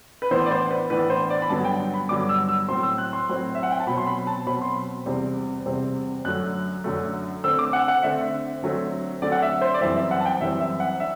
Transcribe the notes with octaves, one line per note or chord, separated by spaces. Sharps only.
B4
A2 E3 B3 D4 C5
D5
C5
B4
A2 E3 B3 D4 B4
C5
D5
B5
G2 D3 F#3 B3 A5
G5
B5
G2 D3 F#3 B3 D6
E6
E6
A2 F#3 C4 C6
E6
F#6
C6
A2 F#3 C4
E5
F#5
G5
A5
B2 F#3 C4 B5
C6
B5
A5
B2 F#3 C4 B5
C6
B5
E2 C3 G3 C4
E2 C3 G3 C4
F#2 D3 F#3 A3 F#6
F#2 D3 F#3 A3
D3 A3 C4 E6
D6
F#5
F#5
D3 A3 C4 E5
D3 F#3 A3 C4
D3 F#3 A3 C4 D5
F#5
E5
C5
D5
F#2 E3 G3 C4 E5
E5
F#5
A5
G5
F#2 E3 G3 C4 E5
E5
F#5
D4 E5